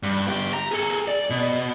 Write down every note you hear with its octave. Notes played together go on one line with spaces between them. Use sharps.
G2
B3 G4
A#5
G#4 A4
D5
B2